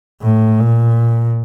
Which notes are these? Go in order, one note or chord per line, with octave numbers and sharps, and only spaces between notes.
A2
A#2